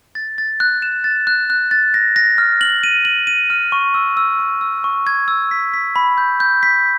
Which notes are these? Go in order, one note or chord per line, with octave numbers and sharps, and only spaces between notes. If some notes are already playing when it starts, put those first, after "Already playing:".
A6
A6
F#6
E7
A6
F#6
F#6
A6
A#6
A#6
F6
F#7
D#7
F#7
D#7
F6
C#6
E6
E6
C#6
E6
C#6
G#6
E6
B6
B6
B5
G6
G6
B6